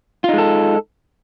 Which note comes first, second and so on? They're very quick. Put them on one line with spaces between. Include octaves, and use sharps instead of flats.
F4 D#4 G#3 A4